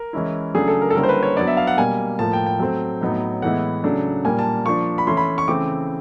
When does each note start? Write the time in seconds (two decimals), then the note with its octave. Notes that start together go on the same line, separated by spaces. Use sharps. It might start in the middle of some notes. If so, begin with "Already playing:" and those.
Already playing: A#4
0.13 E3 G#3 C#4 E4
0.54 C#3 F#3 A3 D4 G#4
0.68 A4
0.82 A#4
0.90 A4
0.95 D3 G3 A#3 C#4 E4 A#4
1.03 C5
1.09 B4
1.23 C#5
1.37 F#3 B3 D4 D5
1.47 E5
1.57 F5
1.67 F#5
1.78 B2 G3 A#3 G#5
2.19 A2 F3 A#3 A5
2.33 G5
2.46 G5
2.60 F#3 A3 C4
3.01 A2 F#3 B3 D#4
3.42 A2 E3 G#3 B3 E4 F#5
3.84 C#3 F#3 A3 D4
4.24 A#2 G3 A#3 G#5
4.39 A5
4.66 F3 A#3 D4 C#6
4.98 B5
5.07 E3 A3 C#4 E4 C6
5.17 B5
5.38 C#6
5.48 C#3 E3 A3 C4 D6